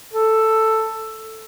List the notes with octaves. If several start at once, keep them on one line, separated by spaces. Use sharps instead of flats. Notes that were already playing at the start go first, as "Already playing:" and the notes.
A4